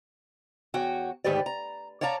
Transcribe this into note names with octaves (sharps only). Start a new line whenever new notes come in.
E2 F#4 C#5 G5
D2 G#2 D#3 G4 B4 D5
A#5
C#5 D5 F5 A5 A#5